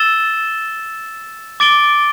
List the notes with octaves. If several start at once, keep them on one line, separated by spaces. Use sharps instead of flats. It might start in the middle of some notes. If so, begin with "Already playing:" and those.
Already playing: E6 A6 E7 G7
D6 A6 D7 G7